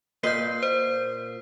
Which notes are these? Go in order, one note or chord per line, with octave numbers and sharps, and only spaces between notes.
A#2 B4 D#5 G6 C7
C5